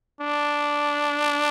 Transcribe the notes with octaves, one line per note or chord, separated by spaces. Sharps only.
D4